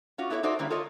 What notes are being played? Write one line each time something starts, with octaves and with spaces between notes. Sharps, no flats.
C#4 F4 F#4
B3 E4 A4 A#4 C#5
D#4 F#4 A4 C5 D5 E5
D3 G3 A#3 C#4 E4
F4 A4 A#4 C#5 D#5